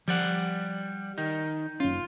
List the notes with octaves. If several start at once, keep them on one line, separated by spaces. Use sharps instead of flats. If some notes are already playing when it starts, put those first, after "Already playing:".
F3 G3 D5 F#5
D#3 D#4
F#1 C#4 F4